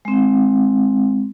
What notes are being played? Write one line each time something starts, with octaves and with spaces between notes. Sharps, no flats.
G#3 C4